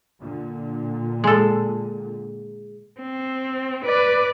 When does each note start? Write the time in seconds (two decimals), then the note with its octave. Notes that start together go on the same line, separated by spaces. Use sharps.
0.19 A#2 D3
1.24 G#3 A4
3.01 C4
3.85 B4 D5